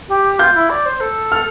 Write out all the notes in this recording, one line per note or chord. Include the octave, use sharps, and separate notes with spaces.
G4
F4 G6
E4
D5
C5
A4
F6